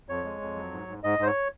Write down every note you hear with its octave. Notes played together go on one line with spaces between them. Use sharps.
F2 C#5
G#3
F2
F#3
G#2
G#2
G#2 D#5
G#2 C5
C#5